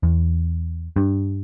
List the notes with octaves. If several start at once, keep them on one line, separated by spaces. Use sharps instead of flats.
E2
G2